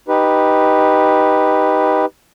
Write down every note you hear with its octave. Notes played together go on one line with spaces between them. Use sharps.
D#4 G4 B4